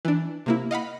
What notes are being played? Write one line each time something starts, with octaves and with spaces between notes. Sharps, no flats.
E3 D4
C3 A#3 E4
D#5 F5 F#5 B5